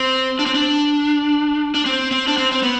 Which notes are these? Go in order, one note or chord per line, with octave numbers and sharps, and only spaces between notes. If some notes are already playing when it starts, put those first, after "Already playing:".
Already playing: C4
D4
C4
D4
D4
C4
C4
D4
C4
C4
B3